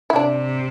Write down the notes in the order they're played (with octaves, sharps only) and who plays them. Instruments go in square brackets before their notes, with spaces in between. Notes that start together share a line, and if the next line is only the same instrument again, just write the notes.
[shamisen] E4
[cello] C3 [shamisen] D4